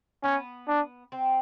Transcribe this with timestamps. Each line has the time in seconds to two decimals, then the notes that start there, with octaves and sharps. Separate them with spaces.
0.23 B3 C#4
0.67 D4
1.12 C4